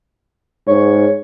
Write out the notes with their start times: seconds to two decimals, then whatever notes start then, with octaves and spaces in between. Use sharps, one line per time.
0.67 G#2 C#5